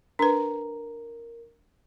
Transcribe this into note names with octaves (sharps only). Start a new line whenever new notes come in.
D4 A#4 B4 A#5